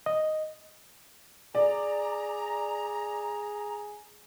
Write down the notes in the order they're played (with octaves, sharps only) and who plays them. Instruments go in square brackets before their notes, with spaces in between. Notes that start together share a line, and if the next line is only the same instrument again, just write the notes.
[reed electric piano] D#5
[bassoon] G#4 [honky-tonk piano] D5 [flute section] A#5